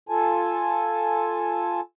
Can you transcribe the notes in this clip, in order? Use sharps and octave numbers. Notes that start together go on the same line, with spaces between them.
F4 A4 G#5 A5